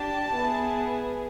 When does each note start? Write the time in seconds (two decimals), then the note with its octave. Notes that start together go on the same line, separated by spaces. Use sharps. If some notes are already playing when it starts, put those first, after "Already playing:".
Already playing: D4 G4 A5
0.33 B3 E4 G#4